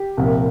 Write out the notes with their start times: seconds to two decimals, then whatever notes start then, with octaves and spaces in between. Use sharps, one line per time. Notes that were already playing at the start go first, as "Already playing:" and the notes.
Already playing: G4
0.17 C2 A#2 F3